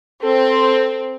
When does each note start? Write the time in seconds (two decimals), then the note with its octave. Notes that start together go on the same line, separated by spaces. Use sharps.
0.23 C4 A4